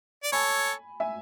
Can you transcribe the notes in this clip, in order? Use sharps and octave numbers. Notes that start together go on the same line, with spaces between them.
D5
A4 C#5 G#5 B5
E5 G#5